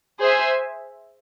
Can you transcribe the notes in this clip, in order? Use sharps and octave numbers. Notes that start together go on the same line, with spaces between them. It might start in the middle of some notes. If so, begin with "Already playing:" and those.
G#4 C5 E5 G#5